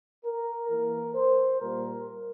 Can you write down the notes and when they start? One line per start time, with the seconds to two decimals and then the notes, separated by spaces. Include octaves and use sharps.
0.25 A#4
0.70 E3 A#3 A#4
1.15 C5
1.61 A#2 G3 A#3 A#4